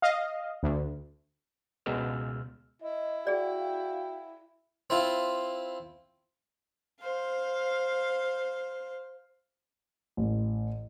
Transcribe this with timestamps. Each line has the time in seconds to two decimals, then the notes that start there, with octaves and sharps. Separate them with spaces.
0.02 D#5 F5
0.63 D2
1.86 C#2 B2 G#3 B3 E6 F6
2.82 E4 D#5
3.27 F#4 G#4 D5 F5 G5
4.90 C4 E4 F4
7.01 C5 F5
10.17 A1